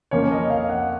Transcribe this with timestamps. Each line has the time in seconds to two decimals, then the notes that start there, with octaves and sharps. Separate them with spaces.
0.11 F2 F3 A#3 C#4 C#5
0.31 D#5
0.50 F5
0.69 F#5